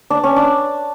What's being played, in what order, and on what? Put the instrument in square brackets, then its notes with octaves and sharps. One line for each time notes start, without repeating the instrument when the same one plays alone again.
[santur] D4
C#4
D4